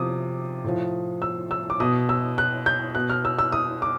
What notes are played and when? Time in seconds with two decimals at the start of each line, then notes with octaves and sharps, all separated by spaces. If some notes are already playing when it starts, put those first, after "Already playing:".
Already playing: C3 F3 D6 D#6
0.64 A2 F3
1.22 E6
1.51 E6
1.70 D6
1.80 B2 D#6
2.09 E6
2.38 F#6
2.66 G6
2.95 B2 F#6
3.10 F6
3.25 E6
3.39 E6
3.52 D#6
3.82 D6